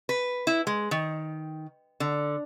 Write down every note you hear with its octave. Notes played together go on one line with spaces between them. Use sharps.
B4
E4
G#3
D#3
D3